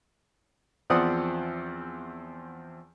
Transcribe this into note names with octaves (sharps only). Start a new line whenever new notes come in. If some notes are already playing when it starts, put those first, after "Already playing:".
E2 F3 C4 D5 F#5 D#6